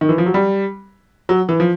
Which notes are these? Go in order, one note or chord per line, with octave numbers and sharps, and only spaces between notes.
D#3
E3
F3
F#3
G3
F#3
E3
F3